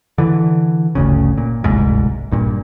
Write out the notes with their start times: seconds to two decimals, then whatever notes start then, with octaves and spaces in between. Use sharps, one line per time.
0.18 D3 E3
0.95 G1 D2 C#3
1.38 A#2
1.64 D1 G1 C2 G#2
2.31 A#1 G2 A#2